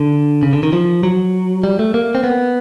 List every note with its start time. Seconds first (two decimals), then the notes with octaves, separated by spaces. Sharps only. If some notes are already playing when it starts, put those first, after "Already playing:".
Already playing: D3
0.43 C#3
0.53 D3
0.63 D#3
0.73 F3
1.03 F#3
1.64 G3
1.79 A3
1.94 A#3
2.15 C4
2.24 B3